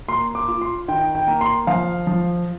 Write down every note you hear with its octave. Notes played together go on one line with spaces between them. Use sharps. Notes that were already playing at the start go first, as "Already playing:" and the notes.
A#3 C6
D6
F4
C6
D#3 G5
G5
A#3
C6
F3 F5
F3